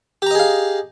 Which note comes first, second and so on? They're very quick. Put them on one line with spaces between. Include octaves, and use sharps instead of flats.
G4 A#5 D#5 G#4 F5